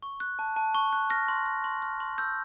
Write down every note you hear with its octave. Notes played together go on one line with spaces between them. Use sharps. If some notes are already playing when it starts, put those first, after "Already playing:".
C#6
F#6
A5
A5
C#6
F#6
F6 A#6
C6
F6
C6
F6
C6
E6 G6